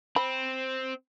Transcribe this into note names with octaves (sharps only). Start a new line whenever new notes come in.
C4 B5